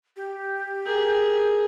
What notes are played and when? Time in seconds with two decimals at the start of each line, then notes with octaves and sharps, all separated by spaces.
0.16 G4
0.86 G#4 A#4